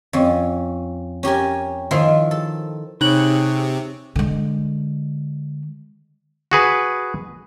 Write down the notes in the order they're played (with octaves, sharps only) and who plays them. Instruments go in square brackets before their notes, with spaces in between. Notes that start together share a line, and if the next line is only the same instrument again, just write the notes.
[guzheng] F2 C#4
C#4 G4 A#4 G#5
D#3 F3 E4 F4
A4
[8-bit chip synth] C3 [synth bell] D#4 F#6 F#7 [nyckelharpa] G#4 C#5
[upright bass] D3 G#3
[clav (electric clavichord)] F#4 G#4 B4